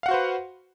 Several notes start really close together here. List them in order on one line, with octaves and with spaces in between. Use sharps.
F5 F#5 F#4 C5 B4